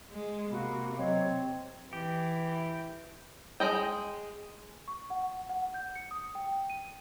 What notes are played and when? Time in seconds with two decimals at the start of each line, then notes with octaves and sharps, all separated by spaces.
0.11 G#3
0.51 C3 A#3 F#4 B5
0.98 F#3 C4 C#5 D#5 A#5
1.93 E3 G4
3.60 G#3 D#5 G5
4.88 C#6
5.10 F#5
5.49 F#5
5.74 G6
5.96 C#7
6.11 D#6
6.35 G5
6.70 D#7